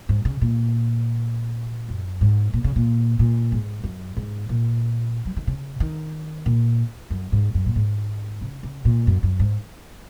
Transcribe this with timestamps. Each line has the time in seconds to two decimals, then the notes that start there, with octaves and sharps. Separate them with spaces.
0.09 G#2
0.25 C#3
0.41 A#2
1.88 F#2
2.21 G#2
2.53 A#2
2.64 C#3
2.76 A#2
3.19 A#2
3.52 G#2
3.84 F#2
4.17 G#2
4.49 A#2
5.26 F#3
5.37 D#3
5.47 C#3
5.80 D#3
6.46 A#2
7.10 F#2
7.32 G#2
7.54 F#2
7.66 A#2
7.76 G#2
8.41 C#3
8.63 C#3
8.85 A#2
9.07 F#2
9.23 F#2
9.40 G#2